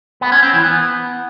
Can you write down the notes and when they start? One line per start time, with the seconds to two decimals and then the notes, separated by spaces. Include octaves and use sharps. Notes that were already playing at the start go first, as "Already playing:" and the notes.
0.21 B3
0.32 C#4
0.43 C4
0.53 E3
0.64 B3